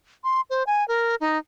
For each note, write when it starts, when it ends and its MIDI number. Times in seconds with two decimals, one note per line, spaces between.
0.24 0.41 84
0.50 0.63 72
0.67 0.86 80
0.88 1.15 70
1.20 1.38 63